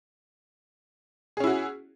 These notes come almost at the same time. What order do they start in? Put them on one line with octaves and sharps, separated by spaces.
G#4 C#4 E4 F#4